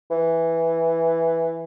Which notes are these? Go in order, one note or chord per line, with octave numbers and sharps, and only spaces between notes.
E3